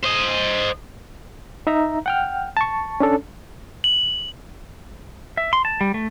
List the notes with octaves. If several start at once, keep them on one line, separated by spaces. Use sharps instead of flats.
C5 D#5
D#4 E5 A#5
F#5 G5 F6
A5 C#6
C#4 D4 A4
F#7
E5
C6
A5
G3
A3